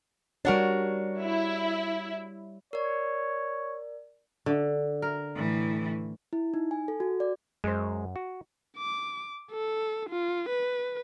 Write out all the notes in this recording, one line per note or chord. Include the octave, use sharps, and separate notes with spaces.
G3 D4 F#4 A#4 C#5
E4
A#4 C#5 D5
D3
A#4
A2 E3
E4
D#4
G#5
A4
F#4
D5
F#2 G#3 C5
F#4
D6
A4
F4
B4